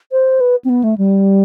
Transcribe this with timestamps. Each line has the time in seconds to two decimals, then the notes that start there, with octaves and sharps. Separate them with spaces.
0.12 C5
0.41 B4
0.65 C4
0.69 B3
0.84 A3
0.98 G3